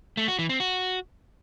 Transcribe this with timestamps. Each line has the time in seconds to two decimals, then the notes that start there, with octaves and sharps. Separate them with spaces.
0.17 A3
0.28 F#4
0.39 E3
0.49 C4
0.60 F#4